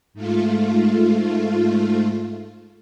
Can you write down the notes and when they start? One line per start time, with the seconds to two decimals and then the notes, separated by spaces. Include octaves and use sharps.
0.14 G#2 A3 F4